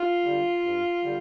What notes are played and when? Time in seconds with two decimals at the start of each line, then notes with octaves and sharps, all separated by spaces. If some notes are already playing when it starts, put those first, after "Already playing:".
Already playing: F4
0.23 D3 G3
0.63 G2
1.02 D3 G3